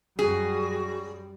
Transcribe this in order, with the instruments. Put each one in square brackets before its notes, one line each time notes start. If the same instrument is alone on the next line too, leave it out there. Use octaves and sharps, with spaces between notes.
[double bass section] F#2 G3 [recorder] F#4 [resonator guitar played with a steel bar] G#4